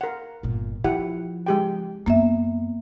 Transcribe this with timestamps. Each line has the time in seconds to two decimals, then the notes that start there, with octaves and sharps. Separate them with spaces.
0.01 A#4 F#5
0.43 G1 A#2
0.84 F3 E4 G4 F#5
1.47 G#3 G4 G5
2.06 F#2 A#3 B3 E5